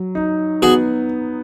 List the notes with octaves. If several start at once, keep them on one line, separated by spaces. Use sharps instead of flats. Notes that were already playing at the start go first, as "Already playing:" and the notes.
Already playing: F#3
D#4
B3 F#4 G#4